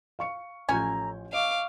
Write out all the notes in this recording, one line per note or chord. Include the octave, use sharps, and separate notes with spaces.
F5 C#6 C#7
A1 F3 C#4 A4 C#5 G#5 A#5 G6
D#5 F5 C#6 D6